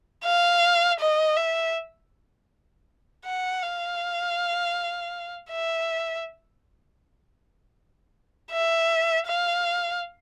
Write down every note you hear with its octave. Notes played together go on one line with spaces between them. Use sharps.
F5
D#5
E5
F#5
F5
E5
E5
F5